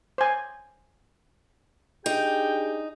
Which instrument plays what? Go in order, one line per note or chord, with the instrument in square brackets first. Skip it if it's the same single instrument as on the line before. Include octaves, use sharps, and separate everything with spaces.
[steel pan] C5 G#5
[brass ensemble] D4 G4 G#4 [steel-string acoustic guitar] D#4 [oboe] G5